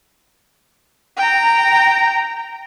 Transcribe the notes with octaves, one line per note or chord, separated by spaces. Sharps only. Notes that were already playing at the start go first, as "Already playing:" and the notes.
G5 A#5